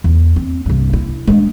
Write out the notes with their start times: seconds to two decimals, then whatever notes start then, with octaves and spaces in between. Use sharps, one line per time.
0.04 E2
0.36 C4
0.66 C2 G2
0.93 E4
1.27 G#3 D4